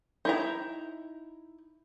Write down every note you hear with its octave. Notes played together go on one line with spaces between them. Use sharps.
D#4 E4 A#5